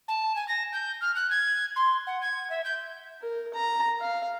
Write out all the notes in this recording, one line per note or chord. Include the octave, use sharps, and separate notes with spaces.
A5
G#5
A#6
G6
F6
F#6
G#6
C6
F#5
G#6
E5
G6
A#4
A#5
F5